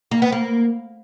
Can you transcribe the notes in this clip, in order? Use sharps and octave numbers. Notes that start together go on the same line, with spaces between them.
A#3
B3
A#3